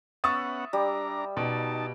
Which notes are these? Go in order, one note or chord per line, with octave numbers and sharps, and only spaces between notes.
B3 C#4 E5 F#5 C#6 D#6 A6
G3 D4 A#5
B2 D#4 A5